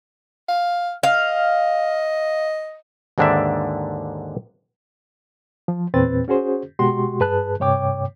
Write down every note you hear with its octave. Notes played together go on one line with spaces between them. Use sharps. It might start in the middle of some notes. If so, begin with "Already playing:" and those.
F5
D#5 F5
D#2 G#2 D3 D4 D5 E5
F3
E2 A#2 C4 B4 A6
C#4 F#4 G#4 C5
B2 G#3 F#4 G4 C6
G2 G#4 B4 A5 F#6
G2 C3 C#5 G5 D6